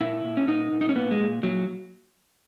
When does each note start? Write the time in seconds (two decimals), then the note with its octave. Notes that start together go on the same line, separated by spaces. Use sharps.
0.01 A#2 E4
0.24 A#2
0.37 C#4
0.48 A#2 D#4
0.72 A#2
0.81 D#4
0.89 C#4
0.96 A#2 B3
1.11 G#3
1.20 A#2
1.43 A#2 F#3